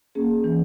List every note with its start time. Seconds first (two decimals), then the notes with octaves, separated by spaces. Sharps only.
0.15 A#3 C#4 G#4
0.44 E3